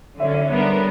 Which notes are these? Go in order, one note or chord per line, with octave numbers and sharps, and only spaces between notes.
D3 F#3 C#4 C#5 E5
C#5 E5
D3 G3 B3 D4 A#4